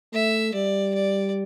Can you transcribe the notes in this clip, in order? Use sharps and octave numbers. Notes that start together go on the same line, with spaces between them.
A3 E5
G3 D5
D5